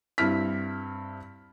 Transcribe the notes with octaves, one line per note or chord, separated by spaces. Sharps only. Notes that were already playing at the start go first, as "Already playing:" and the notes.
G2 C4 E4 F6 B6